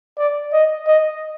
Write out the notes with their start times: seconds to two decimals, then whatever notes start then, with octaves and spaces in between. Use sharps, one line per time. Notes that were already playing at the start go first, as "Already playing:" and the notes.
0.18 D5
0.53 D#5
0.87 D#5